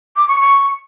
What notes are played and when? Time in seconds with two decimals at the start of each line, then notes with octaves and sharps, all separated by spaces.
0.16 D6
0.28 C#6
0.40 C#6